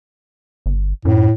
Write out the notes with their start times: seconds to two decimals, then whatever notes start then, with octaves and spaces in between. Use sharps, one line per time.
0.66 G1
1.05 F#2 A2